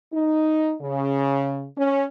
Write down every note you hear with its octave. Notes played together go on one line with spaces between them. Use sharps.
D#4
C#3
C#4